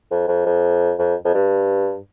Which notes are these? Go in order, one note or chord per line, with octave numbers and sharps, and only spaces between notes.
F2
F2
F2
F2
F2
G2